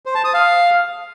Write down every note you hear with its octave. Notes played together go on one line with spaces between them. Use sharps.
C5
A5
D#6
F5